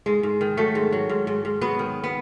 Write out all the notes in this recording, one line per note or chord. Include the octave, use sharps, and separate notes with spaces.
G#2 G#3
G#2
D#3
F#3 A3
G#2
F#3
G#2
G#2
G#2
F#3 B3
D#3
B3